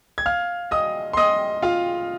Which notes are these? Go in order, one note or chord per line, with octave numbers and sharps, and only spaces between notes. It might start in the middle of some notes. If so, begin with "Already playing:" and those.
G#6
F5 F6
D#5 D#6
C6
D#5 D#6
F4 F5